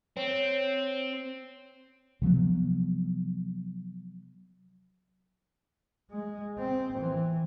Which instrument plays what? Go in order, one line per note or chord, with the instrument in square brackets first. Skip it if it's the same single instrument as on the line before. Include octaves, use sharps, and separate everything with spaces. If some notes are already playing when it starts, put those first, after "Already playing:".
[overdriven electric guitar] C4 [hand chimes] C#5
[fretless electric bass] C3 F3 F#3 B3
[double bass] G#3
C4
E3